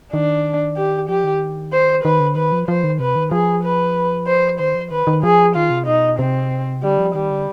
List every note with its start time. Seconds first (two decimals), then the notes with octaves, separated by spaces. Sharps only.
0.13 D#3 D4
0.77 G4
1.09 F3 G4
1.24 D#3
1.73 C5
2.04 D#3 B4
2.20 D3
2.36 D#3 B4
2.52 F3
2.68 F3 C5
2.84 D#3
2.99 C3 B4
3.16 D#3
3.31 F3 G#4
3.64 B4
4.27 C5
4.59 D#3 C5
4.75 F3
4.91 D#3 B4
5.07 D#3
5.23 F3 G#4
5.56 D#3 F4
5.70 C3
5.87 B2 D#4
6.19 C3 C4
6.83 D3 G3
6.98 F3
7.14 D#3 G3
7.30 D3